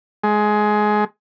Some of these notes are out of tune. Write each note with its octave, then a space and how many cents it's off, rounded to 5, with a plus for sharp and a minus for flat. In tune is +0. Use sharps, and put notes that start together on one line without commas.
G#3 +15